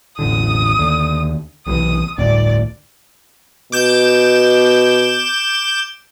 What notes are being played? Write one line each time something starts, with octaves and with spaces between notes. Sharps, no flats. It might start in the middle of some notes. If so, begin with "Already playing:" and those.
E1 A1 D3 D#6
D#2 D3
B1 C3 E3 D#6
G1 D2 A2 D5
B2 D6 G6 E7